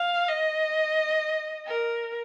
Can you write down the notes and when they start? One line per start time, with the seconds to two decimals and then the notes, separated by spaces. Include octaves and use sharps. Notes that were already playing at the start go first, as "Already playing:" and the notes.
Already playing: F5
0.28 D#5
1.67 A#4